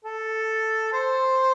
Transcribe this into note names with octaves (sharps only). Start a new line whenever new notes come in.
A4
C5